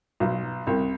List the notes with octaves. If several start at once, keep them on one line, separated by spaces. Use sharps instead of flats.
B1
C2